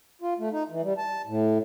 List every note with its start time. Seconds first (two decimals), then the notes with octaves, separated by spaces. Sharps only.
0.22 F4
0.39 A3
0.52 D#4
0.70 E3
0.82 G3
0.98 A5
1.26 A2